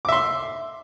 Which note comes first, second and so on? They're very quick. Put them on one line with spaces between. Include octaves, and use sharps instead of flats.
D6 E5 C6